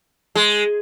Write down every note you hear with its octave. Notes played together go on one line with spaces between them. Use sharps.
G#3